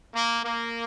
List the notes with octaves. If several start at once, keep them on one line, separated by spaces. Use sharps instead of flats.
A#3
A#3